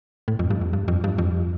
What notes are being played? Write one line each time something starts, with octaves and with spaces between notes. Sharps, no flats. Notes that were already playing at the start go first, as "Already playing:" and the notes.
A2
F2
G2
F2
G2
F2
G2
F2